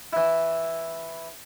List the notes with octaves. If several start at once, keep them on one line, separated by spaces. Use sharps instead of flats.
E3 E4